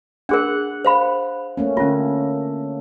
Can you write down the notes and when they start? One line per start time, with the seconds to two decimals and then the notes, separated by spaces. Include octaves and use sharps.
0.29 D4 G#4 A#4 F#5
0.85 C5 F5 B5
1.57 A3 A#3 C#4
1.77 D3 A#3 C#4 F4